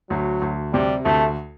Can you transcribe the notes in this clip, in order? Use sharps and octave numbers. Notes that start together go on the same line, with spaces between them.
D2 F#3
D2
C3 G3
D2 A3